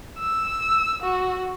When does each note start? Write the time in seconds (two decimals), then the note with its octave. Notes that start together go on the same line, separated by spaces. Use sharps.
0.19 E6
1.02 F#4